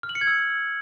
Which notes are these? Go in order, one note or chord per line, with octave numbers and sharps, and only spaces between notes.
F6
F#7
C#7
G#6
E6